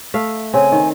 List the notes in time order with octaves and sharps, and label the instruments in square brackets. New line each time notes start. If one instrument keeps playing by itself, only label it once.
[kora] A3 E5 F5
[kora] C#3 C4 [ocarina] G#5
[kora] D#3